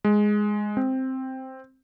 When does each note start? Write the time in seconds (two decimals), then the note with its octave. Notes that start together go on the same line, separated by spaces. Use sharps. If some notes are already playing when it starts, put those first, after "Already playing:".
0.04 G#3
0.77 C4